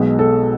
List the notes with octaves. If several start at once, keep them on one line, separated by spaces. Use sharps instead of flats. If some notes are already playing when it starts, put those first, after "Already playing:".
Already playing: B1 B2 G#3
A4